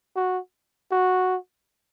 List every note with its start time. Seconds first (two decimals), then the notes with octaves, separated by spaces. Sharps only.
0.16 F#4
0.92 F#4